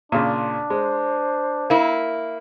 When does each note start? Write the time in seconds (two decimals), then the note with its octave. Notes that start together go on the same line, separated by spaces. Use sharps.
0.12 A#2 C#3 D4 C6
0.70 G#3 C5
1.70 A#3 E4